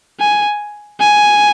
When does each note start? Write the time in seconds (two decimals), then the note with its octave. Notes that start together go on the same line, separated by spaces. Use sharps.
0.20 G#5
1.00 G#5